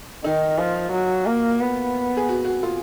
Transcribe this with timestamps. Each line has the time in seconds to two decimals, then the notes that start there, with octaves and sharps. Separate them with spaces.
0.24 D#3 D#4
0.58 F3 F4
0.92 F#3
1.26 A#3
1.61 B3
2.17 G#4
2.29 F#4
2.45 F#4
2.63 F4